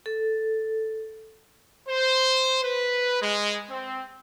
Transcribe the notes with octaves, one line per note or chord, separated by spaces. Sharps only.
A4
C5
B4
G#3
C4